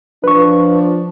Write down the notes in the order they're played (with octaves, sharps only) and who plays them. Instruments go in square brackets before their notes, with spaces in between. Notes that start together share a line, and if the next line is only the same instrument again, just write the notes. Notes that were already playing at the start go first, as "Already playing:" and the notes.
[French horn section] F3 D4 [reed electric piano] B4 C#6